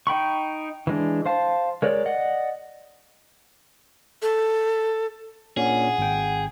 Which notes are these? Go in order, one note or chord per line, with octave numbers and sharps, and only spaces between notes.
D#4 G5 B5 C#6
E3 G#3 D4
C5 F5 A5
G#3 A#4 C#5 D5
D5 D#5 F#5
A4
A#2 C#4 D4 G#4 F#5
G#1 G5